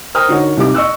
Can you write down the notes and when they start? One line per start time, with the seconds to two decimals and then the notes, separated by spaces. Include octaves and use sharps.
0.15 A#4 C5 G5 A#5 D#6 F6
0.28 D3 D#4 F#4 A#4 C#5
0.57 C2 D#4 G4 D6
0.74 D#5 C#6 E6 F#6